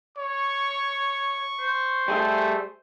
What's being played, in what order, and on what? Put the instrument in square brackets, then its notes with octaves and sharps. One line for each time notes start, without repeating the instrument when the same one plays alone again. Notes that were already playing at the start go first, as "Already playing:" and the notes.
[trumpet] C#5 [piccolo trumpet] C#6
[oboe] C5
[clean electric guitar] G3 G#4 E5 [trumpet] A3